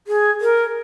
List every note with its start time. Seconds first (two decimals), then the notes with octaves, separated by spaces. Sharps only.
0.07 G#4
0.41 A#4